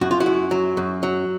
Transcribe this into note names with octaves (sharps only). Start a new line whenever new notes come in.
F#2 F#4
F4
E4 F#4
F#2
F#3
F#2
F#3